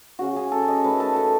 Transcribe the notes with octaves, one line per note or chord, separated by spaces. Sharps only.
C#3 F#3 C#4 F#4
G#4
A4
D#5
D#3 A3 C#4 B4
A4
A4